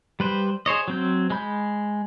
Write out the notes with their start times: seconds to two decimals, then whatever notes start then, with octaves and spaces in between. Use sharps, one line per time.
0.20 G3 B4 C5
0.66 G#4 C5 C#5 D#5
0.88 F#3 C4 G6
1.30 G#3 B5 G6